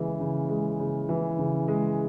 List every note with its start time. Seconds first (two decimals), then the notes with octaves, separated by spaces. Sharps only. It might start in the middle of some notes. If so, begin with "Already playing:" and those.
Already playing: C#3 E3 G#3
0.20 C#3
0.49 G#3
0.80 C#3
1.09 E3
1.39 C#3
1.68 G#3